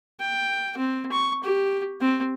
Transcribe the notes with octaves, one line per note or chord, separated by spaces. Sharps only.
G5
C4
C#6
G4
C4